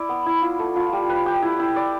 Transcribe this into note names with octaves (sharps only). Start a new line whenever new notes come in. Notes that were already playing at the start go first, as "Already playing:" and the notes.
Already playing: E4 D5
B3
E4
F4
A3
F4
G3
B4
G4
E4
E4
D5